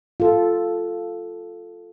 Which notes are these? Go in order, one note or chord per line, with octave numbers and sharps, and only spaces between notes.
F4 A4